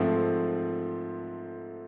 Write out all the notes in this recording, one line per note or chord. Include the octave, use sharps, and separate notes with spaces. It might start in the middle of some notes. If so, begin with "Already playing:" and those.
Already playing: G#2 F3 A3 C4